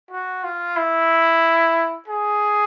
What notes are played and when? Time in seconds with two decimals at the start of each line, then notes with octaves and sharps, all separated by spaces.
0.11 F#4
0.44 F4
0.77 E4
2.08 G#4